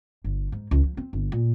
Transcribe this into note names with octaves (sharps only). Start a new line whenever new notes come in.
G1
G#2
C#2
F3
C4
G1
A#2